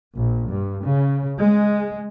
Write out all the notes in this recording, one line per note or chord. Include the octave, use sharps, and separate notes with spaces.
A#1
G2
C#3
G#3